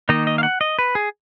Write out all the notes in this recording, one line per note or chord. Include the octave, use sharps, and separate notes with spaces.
D#3 A#3 D#4 D#5
D#5
F5
F#5
D#5
B4
G#4